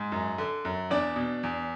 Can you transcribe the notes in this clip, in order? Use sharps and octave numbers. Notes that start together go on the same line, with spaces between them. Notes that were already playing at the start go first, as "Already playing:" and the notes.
Already playing: G#2
F#2
D3
F#2
E2 D4 D5
B2
E2